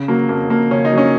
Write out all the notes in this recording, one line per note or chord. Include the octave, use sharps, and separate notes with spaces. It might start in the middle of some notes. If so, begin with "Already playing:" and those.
Already playing: C#3
F#3 A#3
F2 A#3
F2 A#3
C#3 C#4
D#4
F#3 C#4